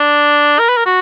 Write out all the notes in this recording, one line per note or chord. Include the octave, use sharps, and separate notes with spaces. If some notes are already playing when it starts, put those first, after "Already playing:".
Already playing: D4
A#4
B4
A#4
F#4